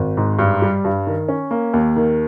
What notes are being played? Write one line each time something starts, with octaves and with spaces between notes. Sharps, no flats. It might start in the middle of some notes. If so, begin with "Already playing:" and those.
Already playing: G#1
G#2
G2
G3
G2
D#3
C#4
A#3
D#2
D#3